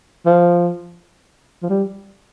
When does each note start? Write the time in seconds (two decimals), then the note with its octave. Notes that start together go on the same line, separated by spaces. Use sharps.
0.26 F3
1.63 F3
1.69 G3